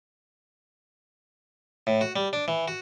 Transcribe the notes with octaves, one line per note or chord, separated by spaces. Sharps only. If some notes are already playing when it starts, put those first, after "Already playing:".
A2
F#4
G3
D4
E3
F#4